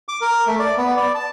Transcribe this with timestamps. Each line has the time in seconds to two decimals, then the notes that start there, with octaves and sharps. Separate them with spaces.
0.09 D6
0.21 A#4
0.47 A3
0.59 D5
0.77 B3
0.97 D5
1.15 A5